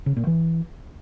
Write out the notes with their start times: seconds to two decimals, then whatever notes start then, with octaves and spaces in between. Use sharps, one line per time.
0.06 C#3
0.17 A#2
0.27 E3